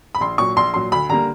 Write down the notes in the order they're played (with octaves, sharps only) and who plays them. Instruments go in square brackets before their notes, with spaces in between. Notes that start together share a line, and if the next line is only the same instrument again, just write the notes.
[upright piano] B5
A#1 C6
A#2 F#3 C#6
A#1 C6
A#2 F#3 C6
D2 B5
D3 G3 A#3 A#5